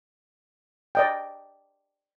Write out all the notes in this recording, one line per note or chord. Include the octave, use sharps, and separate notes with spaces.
D5 D#5 G5